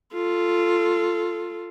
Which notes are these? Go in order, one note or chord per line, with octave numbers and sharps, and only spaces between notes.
F4 A4